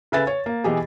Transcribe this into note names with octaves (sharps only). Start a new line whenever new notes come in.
C#3 A4 B4 E5 G#5 A6
C#5
A#3
B2 E3 G4 G#4